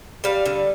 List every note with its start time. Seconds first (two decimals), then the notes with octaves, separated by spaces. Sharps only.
0.24 G3 F5
0.46 D3